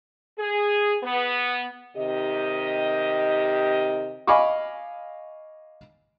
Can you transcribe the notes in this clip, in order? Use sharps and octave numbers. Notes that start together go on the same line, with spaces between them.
G#4
B3
C3 D#3 G4 D#5
D#5 F5 G#5 B5 C#6 D6